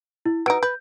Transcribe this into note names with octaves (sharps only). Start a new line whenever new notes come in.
E4
F#3 D#4 B4 D7
B4 G6